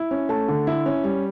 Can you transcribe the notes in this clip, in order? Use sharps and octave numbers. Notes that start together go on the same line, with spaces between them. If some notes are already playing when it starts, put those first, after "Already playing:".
Already playing: E4
C#4
A3 A5
D3
E4
C#4
G3